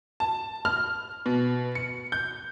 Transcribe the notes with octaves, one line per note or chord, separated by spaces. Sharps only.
A5
F6
B2
C#7
G6